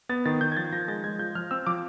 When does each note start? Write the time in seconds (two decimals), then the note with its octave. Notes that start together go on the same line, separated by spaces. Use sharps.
0.09 B3 A6
0.26 D#3 A6
0.41 D#3 G6
0.52 G#6
0.57 F3 A6
0.72 F3 A#6
0.88 G#3 A6
1.04 G#3 G#6
1.19 F3 G6
1.35 F3 F6
1.51 C4 E6
1.67 F3 D6